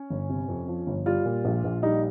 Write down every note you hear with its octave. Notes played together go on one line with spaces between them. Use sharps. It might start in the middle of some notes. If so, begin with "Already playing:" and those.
Already playing: C#4
G1
C3
F2
F3
G1
G3 F4
A#2
A#1
A#1
G3 D#4